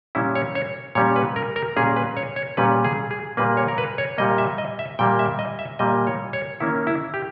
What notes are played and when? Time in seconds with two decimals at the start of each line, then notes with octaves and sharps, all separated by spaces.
0.15 A#2 G3 C#4 E4
0.35 C#5
0.55 C#5
0.95 A#2 G3 C#4 C#5
1.16 B4
1.36 A#4
1.56 A#4
1.76 A#2 G3 C#4 G#4
1.96 B4
2.17 C#5
2.36 C#5
2.57 A#2 G3 C#4 B4
2.85 G#4
3.11 G#4
3.37 A#2 G3 A#3 B4
3.57 C#5
3.68 A#4
3.78 B4
3.98 C#5
4.18 A#2 G3 A#3 D#5
4.38 E5
4.58 D#5
4.79 E5
4.99 A#2 G3 A#3 G5
5.19 E5
5.39 D#5
5.59 E5
5.79 A#2 G3 A#3 D#5
6.07 C#5
6.33 C#5
6.60 D#3 A#3 C#4 E4
6.87 E4
7.14 G4